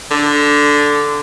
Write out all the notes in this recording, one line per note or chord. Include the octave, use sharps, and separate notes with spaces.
D3